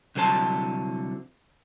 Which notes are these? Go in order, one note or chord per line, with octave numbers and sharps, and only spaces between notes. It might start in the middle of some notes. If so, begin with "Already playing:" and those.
C2 D3 F#3 C5 A5